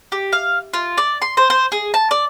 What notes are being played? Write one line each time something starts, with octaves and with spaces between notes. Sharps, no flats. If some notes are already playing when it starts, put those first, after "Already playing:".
G4
F5
F4
D5
C6
C5
C5
G#4
A5
D5